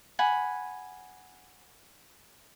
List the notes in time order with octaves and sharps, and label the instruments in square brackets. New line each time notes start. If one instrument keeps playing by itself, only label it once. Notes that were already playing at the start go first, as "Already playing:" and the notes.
[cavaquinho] F#5 G#5 B5